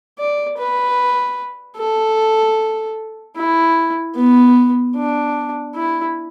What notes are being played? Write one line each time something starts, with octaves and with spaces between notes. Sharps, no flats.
D5
B4
A4
E4
B3
D4
E4